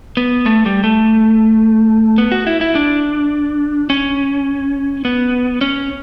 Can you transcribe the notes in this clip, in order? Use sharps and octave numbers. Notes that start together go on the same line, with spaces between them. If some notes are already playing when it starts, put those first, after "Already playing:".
B3
A3
G3
A3
B3
F#4
E4
E4
D4
C#4
B3
C#4